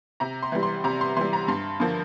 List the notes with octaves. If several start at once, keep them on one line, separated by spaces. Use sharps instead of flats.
C3 A#5
C6
E3 G3
C6
C3 A#5
C6
E3 G3 C6
A#5
G2 C6
D3 F3 A#3